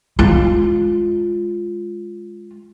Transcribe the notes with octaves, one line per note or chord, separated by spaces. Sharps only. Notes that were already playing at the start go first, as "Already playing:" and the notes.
G#3 F4